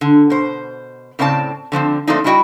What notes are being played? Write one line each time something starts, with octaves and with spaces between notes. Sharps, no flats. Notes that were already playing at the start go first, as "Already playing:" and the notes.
D3
B2 C5
A2 C#3 C4 D5 D#5 A5
D3 F3 B3 C4
F3 A3 A#3 C4 D4 D#4
G3 A3 E4 F#4 D#5 G5